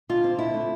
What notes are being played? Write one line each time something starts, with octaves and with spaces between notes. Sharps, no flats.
D3 F4
C4
D3 E4
A3